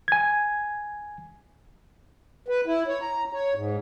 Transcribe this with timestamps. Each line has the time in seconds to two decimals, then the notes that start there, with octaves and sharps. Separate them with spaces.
0.08 G#5 G#6
2.48 B4
2.66 E4
2.88 C#5
3.01 A#5
3.33 C#5
3.54 G#2